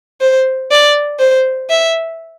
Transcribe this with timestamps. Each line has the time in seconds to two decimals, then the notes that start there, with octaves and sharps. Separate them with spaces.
0.21 C5
0.71 D5
1.19 C5
1.70 E5